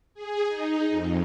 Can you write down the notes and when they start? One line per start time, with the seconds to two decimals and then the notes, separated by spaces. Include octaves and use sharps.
0.14 G#4
0.48 D#4
0.89 F2